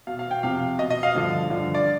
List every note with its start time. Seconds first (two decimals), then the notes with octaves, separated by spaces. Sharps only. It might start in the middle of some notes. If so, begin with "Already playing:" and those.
0.07 B2 F5
0.19 F5
0.31 G5
0.43 F2 C3 F3 F5
0.78 B2 D#5
0.90 D#5
1.03 F5
1.14 G2 D3 F3
1.50 G2 D3 F3
1.74 D5